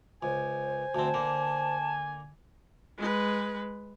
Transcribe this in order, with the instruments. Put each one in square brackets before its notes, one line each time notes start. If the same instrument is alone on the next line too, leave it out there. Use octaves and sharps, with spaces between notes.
[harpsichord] C#2 [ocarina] C5 [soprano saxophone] G#5
[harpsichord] D2 C4 [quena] A5
[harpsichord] D3 A#3
[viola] G#3 B4